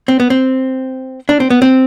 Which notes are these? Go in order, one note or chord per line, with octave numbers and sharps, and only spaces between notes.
C4
B3
C4
D4
C4
B3
C4